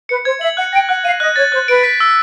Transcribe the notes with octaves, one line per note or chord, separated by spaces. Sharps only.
B4 C#7
C5 G#6
E5 F#7
F#5 F#6
G5 A#6
F#5 F#6
F5 D#7
D#5 F#6
C#5 A6
C5 F#6
B4 D7
B6
E6